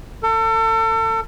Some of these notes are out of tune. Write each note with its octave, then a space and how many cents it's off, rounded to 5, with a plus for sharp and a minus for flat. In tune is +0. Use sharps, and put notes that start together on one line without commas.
A4 +35